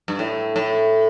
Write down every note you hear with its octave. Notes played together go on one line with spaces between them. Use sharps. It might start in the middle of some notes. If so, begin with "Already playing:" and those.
G2
A2
A2